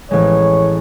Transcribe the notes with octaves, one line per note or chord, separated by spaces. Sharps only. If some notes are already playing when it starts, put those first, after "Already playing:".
A1 G#3 C#5